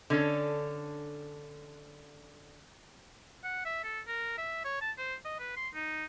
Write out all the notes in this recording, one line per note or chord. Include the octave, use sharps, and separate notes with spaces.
D3 C#4 A4
F#5
E5
A4
A#4
E5
C#5
A5
C5
D#5
B4
C6
D#4